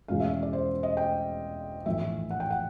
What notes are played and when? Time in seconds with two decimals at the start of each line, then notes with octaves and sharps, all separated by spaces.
0.08 E2 B2 G#3 C#4 F5
0.20 E5
0.43 D5
0.53 C5
0.83 D#5
0.97 G5
1.86 A#1 A2 E3 E5
2.31 F#5
2.40 G5
2.50 F#5